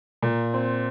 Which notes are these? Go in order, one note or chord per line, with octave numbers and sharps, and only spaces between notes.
A#2
C4